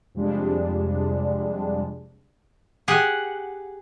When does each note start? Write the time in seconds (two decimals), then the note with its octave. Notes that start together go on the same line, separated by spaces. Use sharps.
0.15 F2 C3 F3 G3 G#3 D4
2.88 G4 G#4 F#5